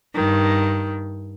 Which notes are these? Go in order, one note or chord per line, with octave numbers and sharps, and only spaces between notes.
G2 D#3